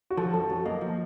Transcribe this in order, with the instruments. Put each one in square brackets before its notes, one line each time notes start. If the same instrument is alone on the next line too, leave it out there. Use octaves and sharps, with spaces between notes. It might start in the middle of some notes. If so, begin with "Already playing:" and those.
[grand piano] F#4
[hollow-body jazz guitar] F3 [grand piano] A4
[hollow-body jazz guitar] F#2 [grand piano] A4
[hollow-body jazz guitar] F#2 [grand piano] F#4
[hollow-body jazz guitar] A#3 [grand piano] D#5
[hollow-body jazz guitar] F3